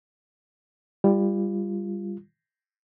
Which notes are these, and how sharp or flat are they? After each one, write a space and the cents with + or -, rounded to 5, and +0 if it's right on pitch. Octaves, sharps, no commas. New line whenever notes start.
G3 +15 F4 -20